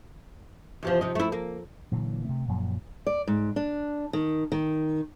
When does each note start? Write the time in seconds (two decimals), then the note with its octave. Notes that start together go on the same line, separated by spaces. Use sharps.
0.83 E2 C3 F3
1.01 C3 D#4
1.15 A3 E4
1.32 A#3
1.92 A#2 D3 E3 F#3
2.25 C3 A3
2.48 F#2 A#2 F3 F#3
3.07 D5
3.28 G#2
3.56 D4
4.13 D#3
4.52 D#3